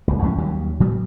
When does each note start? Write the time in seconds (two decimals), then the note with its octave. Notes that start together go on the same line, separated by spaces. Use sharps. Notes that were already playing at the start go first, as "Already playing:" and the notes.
0.08 F#1 C#2
0.22 D#2 A2 F3 C#4
0.38 D#2 D#3 F#3 G3
0.80 A2 F#3 G3 B3